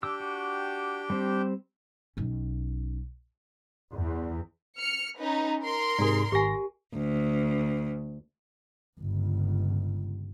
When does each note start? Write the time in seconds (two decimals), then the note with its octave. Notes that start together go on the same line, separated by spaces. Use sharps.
0.03 D4 G4 G5 D6 E6
0.20 F#4
1.10 G3 C4
2.17 B1 C#4
3.94 E2
4.77 F6 C#7
5.17 C#4 D#4 B4
5.63 A#4 C6
5.99 G#2 C3 G#4 D5
6.32 G#1 G4 G#5 A#6
6.93 D2
8.99 G1 C#2